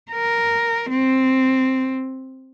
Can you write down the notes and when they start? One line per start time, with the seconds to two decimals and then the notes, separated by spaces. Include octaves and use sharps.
0.12 A#4
0.90 C4